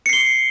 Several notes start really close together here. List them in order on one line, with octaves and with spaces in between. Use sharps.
C#7 C7 G7